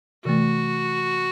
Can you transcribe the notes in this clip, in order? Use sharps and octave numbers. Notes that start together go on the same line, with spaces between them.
C3 E3 A3 F#4